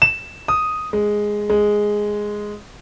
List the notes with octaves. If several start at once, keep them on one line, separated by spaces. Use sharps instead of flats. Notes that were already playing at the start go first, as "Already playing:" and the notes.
E7
D#6
G#3
G#3